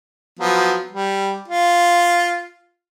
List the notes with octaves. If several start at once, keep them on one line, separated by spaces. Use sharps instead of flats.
F3 F#3 B3
G3
F4